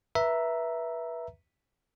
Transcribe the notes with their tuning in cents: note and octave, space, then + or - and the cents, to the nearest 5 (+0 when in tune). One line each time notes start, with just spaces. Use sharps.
B4 -25 E5 +0 A#5 +0